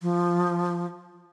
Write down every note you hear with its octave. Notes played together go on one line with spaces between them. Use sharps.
F3